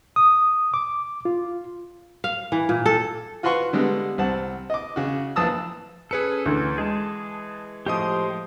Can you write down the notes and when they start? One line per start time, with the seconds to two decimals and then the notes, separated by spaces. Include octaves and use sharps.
0.16 D#6
0.74 D6
1.25 F4
2.24 F5
2.52 E3
2.69 A#2
2.86 A4
3.43 F4 F#4 B4 F#5 C6 C#6
3.73 D3 G3 G#3 B3
4.18 C2 C4 F#5 A5
4.70 D#5 D6
4.96 C#3 F#4
5.36 A#1 E3 A5 D#6 E6
6.11 C#4 G#4 A4 B4 C#7
6.46 D2 E3
6.78 G#3 G#4 A5
7.86 A2 F3 G4 D#5 G5 D#6